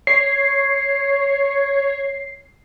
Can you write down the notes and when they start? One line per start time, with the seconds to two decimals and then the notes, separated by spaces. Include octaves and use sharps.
0.07 C#5 C7